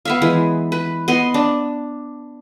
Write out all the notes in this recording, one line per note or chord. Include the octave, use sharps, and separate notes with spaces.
B3 E5 F5
E3 G#3
B4
B3 D#5 C6
D4